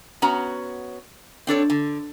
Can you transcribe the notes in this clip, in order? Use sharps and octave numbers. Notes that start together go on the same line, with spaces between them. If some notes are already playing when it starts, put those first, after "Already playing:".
B3 C#4 F#4 A#5
C4 D4 A4 C#5
D3